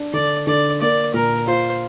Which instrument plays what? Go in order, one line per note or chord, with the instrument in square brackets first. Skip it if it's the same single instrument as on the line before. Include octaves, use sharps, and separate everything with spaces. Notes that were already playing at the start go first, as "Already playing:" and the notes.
Already playing: [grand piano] D4
[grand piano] D3 [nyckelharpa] D5
[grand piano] D3 [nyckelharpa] D5
[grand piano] A#3 [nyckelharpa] D5
[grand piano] A#2 [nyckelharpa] A#4
[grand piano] F4 [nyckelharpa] C5